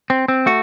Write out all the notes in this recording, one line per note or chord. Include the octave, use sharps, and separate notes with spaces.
C4
C4
A3 F#4